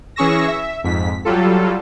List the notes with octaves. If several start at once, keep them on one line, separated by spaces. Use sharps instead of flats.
E3 C#4 G#4 C#6 E6 A#6
E5
F2 G#2 B6
F#3 G3 F4 A4